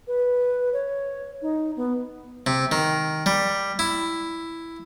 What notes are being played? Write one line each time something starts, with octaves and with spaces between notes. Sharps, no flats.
B4
C#5
D#4
B3
C3
D#3
G3
E4